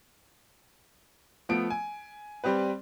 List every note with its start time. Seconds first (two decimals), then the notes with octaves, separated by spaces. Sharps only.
1.49 F3 A3 B3 D7
1.70 G#5
2.44 G3 C4 G4 B4